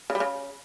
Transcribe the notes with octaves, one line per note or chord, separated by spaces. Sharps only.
C#3
G3
C#3